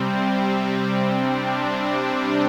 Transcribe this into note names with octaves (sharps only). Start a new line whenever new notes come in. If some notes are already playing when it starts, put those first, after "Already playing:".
Already playing: C3 G3 C4
D4